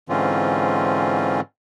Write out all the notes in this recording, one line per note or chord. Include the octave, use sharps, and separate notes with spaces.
G#2 D3 E3 C4 C#4 F4